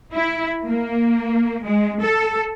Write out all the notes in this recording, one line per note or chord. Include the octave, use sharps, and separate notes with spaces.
E4
A#3
G#3
A4